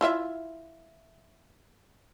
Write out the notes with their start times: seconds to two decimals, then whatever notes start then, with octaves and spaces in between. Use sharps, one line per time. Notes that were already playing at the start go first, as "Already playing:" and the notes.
0.01 E4 F4 E5